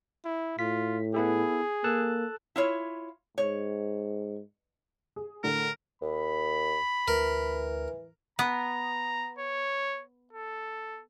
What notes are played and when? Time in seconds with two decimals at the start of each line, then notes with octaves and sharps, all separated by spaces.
0.25 E4
0.59 A2 F4 B6
1.14 B3 E4 G#4 A4
1.84 A#3 A4 A5 F#6
2.56 E4 F4 C#5
3.38 G#2 C#5
5.16 G#4
5.44 A2 D3 A3 A#4
6.02 D#2 B5
7.08 D2 E3 A#4
8.39 B3 A#5
9.38 C#5
10.33 A4